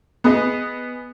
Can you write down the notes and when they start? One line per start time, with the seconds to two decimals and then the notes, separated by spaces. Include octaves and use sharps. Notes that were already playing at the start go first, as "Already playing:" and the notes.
0.24 B3 G#4 D#5